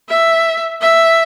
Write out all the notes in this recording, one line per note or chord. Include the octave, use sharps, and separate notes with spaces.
E5
E5